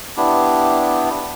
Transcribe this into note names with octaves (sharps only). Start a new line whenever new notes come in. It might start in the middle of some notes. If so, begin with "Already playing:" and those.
B3 D4 E4 G4